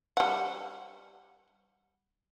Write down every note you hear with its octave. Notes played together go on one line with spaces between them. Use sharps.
G3 F#5